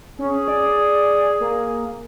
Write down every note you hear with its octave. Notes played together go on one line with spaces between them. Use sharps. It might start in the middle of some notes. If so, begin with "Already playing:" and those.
C#4 G#4
D5
A#3